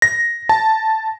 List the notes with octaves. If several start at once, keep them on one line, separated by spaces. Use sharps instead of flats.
A#6
A5